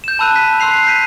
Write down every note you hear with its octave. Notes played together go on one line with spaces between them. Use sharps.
G6 E7
A5 B5 E6 F#6 D#7
B6
C6 E6 F#6 C7 F7
C7
G6 B6 D#7